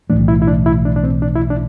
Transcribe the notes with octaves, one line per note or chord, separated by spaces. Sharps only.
B1 A2 E3 A3 D4
E4
E4
D4
E4
D4
D4
C4
D4
E4
D4